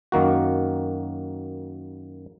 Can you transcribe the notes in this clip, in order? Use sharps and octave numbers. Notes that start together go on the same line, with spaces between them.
F#2 D#3 A#3 F#4